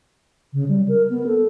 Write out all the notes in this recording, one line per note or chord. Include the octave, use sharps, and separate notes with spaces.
C#3
G3
A#4
B3
A4